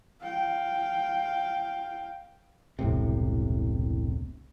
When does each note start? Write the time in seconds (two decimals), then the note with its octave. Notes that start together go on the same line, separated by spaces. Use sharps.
0.21 F5 G5
2.79 E1 C2 A2 C3